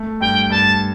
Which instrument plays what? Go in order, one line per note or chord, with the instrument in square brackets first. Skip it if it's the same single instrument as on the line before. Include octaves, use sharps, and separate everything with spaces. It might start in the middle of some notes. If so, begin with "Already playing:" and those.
Already playing: [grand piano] A3
[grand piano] G2 [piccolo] G5
[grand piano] G2 [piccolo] A5